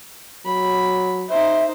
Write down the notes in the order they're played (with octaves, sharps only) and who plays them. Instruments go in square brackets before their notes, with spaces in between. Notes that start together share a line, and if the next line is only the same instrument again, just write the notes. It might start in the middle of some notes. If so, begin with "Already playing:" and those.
[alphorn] F#3 [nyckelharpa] B5
[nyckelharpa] D#4 C5 [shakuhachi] E5